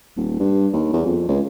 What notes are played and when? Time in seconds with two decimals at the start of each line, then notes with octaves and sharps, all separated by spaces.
0.16 D#1
0.40 G2
0.73 D#2
0.93 E2
1.05 F2
1.28 C#2